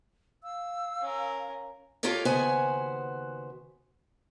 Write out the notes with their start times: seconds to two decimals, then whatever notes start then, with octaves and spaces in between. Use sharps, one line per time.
0.44 F5 E6
1.01 C#4 A#4
2.03 F4 G4 A4 C#5 D5
2.25 D#2 C#3 B3 F#4 C5 G#5